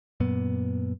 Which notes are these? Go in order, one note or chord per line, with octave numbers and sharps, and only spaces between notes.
F#2 A#2 B3